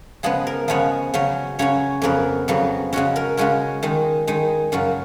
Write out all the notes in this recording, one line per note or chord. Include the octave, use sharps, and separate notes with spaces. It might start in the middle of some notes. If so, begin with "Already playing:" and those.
C#3 F3 G#3 B3 G#4
A#4
C#3 F3 G#3 B3 C#5
C#3 F#3 C#4
C#3 F#3 C#4 C#5
F2 C#3 F#3 B3 A#4
F2 C#3 F#3 B3
C#3 G#3 C#4 F#4
A#4
C#3 G#3 C#4 F#4
D#3 G#3 D#4
D#3 G#3 D#4
F#2 C#3 F#3 F4